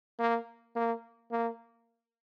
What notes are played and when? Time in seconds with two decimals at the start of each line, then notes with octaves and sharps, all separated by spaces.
0.20 A#3
0.76 A#3
1.31 A#3